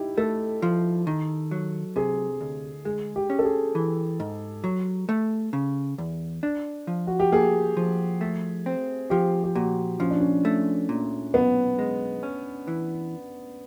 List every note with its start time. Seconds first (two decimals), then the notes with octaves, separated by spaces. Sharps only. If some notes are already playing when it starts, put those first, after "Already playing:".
Already playing: D#4 E4 G4
0.17 A3 A4
0.62 F3
1.07 D#3
1.51 F#3
1.96 C3 G#4
2.41 D2
2.85 G#3 G#4
3.16 G4
3.30 C#4
3.39 A4
3.45 G#4
3.75 E3
4.20 G#2
4.64 F#3
5.09 A3
5.53 C#3
5.98 E2
6.43 D4
6.87 F3
7.07 F#4
7.19 G4
7.32 A#3 G#4
7.77 F3
8.21 A3
8.66 C4
9.10 F3 G4
9.44 G4
9.55 A#2 F#4
10.00 F3 C#4
10.10 D4
10.20 C#4
10.45 A3
10.89 A#2
11.34 B1 B3
11.79 G#3
12.23 C#4
12.68 E3